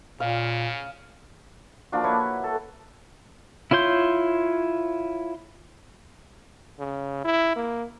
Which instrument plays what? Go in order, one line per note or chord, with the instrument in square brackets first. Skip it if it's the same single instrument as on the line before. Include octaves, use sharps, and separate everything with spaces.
[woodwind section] A#2 [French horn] C#3 [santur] F5
[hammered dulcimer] F3 A#3 D4 F#4
E4 B4 C#5
A4
[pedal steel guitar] E4 F4 C#5 C6 G6
[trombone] C#3
E4
A#3